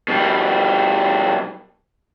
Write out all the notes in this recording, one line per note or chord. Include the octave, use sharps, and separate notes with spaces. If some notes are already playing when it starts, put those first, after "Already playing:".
B2 G3